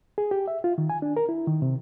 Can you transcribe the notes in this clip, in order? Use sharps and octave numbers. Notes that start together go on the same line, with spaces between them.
G#4
G4
E5
F4
D#3
G#5
D4
A#4
E4
D#3
C3